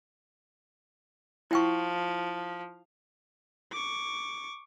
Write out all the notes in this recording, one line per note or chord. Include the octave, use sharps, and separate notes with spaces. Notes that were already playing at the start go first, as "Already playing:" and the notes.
F3 E4 G5 C#6
C#6 D6